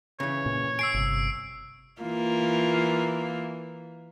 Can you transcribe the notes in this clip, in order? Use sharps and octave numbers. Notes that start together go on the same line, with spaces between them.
C#3 E3 C#5
A#2
G#5 E6 C7 D7
G1 C3
E3 A#3 F4